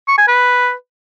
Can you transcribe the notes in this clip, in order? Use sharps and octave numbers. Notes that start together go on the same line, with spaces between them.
C#6
G#5
B4